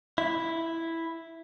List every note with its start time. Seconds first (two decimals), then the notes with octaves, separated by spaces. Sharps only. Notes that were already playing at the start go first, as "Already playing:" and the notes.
0.18 E4